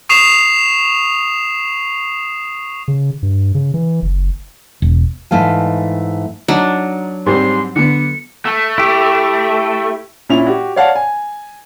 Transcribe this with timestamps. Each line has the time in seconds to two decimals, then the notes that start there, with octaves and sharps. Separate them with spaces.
0.09 C#6 D#6 C7 E7 F7
2.88 C#3
3.23 G2
3.55 C#3
3.74 E3
4.02 F#1
4.82 E1
5.31 G#2 E3 A3 F5 G#5
6.48 F#3 D4 D#4
7.26 G#2 G3 C4 C6
7.76 D3 B3 C#7
8.45 A3
8.78 E4 G4
10.29 A#2 C#4 E4 F7
10.47 F#4 G4
10.76 C#5 D5 F5 F#5 A5
10.96 G#5